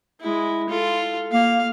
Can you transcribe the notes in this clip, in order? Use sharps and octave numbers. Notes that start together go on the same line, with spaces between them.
G#3 E4
F4 A4
A#3 F5